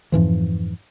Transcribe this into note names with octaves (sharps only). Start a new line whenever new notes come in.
F2 G#2 E3 F3